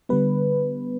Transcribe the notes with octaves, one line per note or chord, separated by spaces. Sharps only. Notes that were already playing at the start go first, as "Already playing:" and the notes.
D3 G3 B3 B4